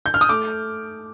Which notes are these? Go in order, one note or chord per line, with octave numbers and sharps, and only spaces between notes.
G6
F6
D#6
A3 D6